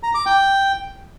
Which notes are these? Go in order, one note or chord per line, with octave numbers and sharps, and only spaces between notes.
A#5
D6
G5